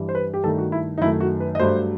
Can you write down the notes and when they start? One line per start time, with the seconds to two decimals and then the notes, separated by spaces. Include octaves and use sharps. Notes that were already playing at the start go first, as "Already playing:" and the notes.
Already playing: G2 E3 G3
0.09 C5
0.15 B4
0.34 G4
0.44 G2 D#3 A3 A4
0.58 F#4
0.72 E4
0.98 D#4
1.01 F#2 D#3 A3 E4
1.20 F#4
1.40 B4
1.55 D#5
1.60 G2 F#3 A3 C5